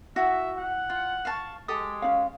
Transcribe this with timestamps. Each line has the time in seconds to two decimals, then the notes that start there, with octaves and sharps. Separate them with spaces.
0.16 E4 F#4 E5
0.58 F#5
0.90 F4
1.25 F5 A5 C#6
1.68 G#3 G4 A4 D#6
2.02 C#4 D#4 F5